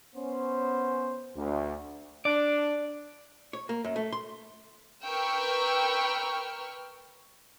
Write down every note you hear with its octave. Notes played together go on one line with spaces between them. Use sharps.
B3 C#4 C5
D2
D4 D5
C#5
A#3
F#2
A3
C6
A#4 B4 G5 C#6 E6 F6